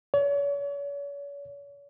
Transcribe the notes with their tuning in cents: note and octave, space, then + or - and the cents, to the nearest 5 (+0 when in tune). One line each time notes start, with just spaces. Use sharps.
C#5 +40